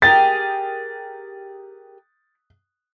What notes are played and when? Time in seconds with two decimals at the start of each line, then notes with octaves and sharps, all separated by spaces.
0.02 G4 G#4 A#4 A6